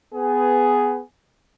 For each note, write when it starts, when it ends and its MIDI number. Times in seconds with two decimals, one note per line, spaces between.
0.14 1.00 59
0.14 1.00 68